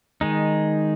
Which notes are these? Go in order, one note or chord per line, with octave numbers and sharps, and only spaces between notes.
D#3 G#3 D#4